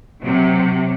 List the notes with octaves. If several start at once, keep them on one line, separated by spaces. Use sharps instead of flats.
C3 F#3